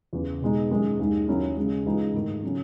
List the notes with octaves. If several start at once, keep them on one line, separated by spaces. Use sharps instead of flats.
E2 C#3 E3
B2 G#3 D#4
F#2 D#3 G#3
D#2 D#3 G#3
D#2 D#3 F#3 C#4 E4
C#3 G#3 C#4
C#2 C#3 E3 G#3 D#4
G#2 D#3 A3
C#3 F#3 C#4